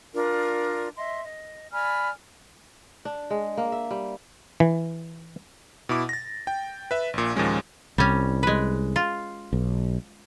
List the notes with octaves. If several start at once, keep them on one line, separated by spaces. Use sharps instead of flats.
D4 F4 A#4 D5
D#5 E5 C6
D#5
D5 G#5 B5 F6
D4
G#3
A#3
E5
G3
E3
B2 E4 D6
A6 A#6
G5
B4 E5
A#1 A#2
D#2 A#2 F3 G#3 C#4
C2 G3 C#4
G#3 B4
F4
B1